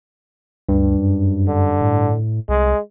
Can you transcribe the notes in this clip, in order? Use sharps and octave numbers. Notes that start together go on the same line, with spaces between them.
D2 G2
F#2
D3
A2
C2 G#3